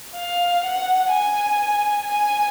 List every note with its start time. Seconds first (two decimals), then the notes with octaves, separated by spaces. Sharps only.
0.16 F5
0.64 F#5
1.10 G#5
2.05 G#5